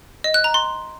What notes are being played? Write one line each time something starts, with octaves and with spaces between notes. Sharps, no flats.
D#5
F#6
A#5
C6